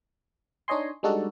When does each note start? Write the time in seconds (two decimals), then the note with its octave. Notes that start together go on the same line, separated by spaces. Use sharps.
0.68 D4 D#4 C#5 D#5 G#5 C6
1.03 G3 G#3 D4 D#4 F#4 A4